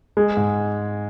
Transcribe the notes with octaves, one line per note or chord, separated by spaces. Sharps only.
G#3
G#2